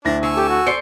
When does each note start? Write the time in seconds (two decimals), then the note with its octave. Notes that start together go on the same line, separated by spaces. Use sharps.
0.05 D2 D4 E4 A#6
0.23 D3 G#5 C#6 E6
0.37 G4 A4
0.49 F#4
0.67 C5 D5 C7 C#7